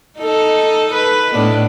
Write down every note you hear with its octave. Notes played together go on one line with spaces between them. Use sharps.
D#4 A4
B4
A2 B3 D4